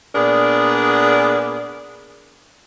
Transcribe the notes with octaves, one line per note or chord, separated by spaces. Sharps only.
A#2 B3 D4 G#4 A#4 D5